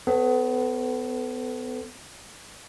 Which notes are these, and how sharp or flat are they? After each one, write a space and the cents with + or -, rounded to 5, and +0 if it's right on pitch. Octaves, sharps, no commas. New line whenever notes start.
B3 +30 A4 +0 C#5 -25